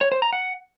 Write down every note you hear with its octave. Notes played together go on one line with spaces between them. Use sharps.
C#5
C5
A#5
F#5